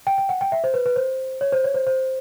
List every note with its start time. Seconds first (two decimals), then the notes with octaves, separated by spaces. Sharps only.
0.07 G5
0.18 G5
0.29 F#5
0.41 G5
0.52 E5
0.64 C5
0.74 B4
0.86 B4
0.96 C5
1.41 C#5
1.52 C5
1.64 C#5
1.74 C5
1.87 C5